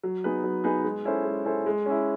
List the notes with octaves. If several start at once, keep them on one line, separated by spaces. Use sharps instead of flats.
F#3
B3 D#4 G#4 B4
F#3
B3 D#4 G#4 B4
G#3
C#4 E4 A4 C5
G#3
C#4 E4 A4 C5
G#3
C#4 E4